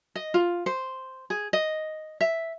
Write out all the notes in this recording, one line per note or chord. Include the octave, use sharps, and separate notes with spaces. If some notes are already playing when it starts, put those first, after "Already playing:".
D#5
F4
C5
G#4
D#5
E5